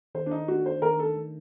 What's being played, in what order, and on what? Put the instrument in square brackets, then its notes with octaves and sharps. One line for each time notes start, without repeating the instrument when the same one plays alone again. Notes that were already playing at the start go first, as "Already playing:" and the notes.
[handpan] D#3 [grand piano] C5
[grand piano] D4
D#4
[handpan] A3 D4 [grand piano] F#4
[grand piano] C5
[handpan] D#3 [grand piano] A#4
[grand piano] A4
[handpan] A3 D4